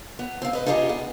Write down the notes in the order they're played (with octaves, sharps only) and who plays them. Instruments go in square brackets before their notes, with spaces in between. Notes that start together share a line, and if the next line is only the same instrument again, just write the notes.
[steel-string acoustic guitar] B3
C4 F5
B4 D#5
D#4 F4 G4 G#4 C5 D#5
B3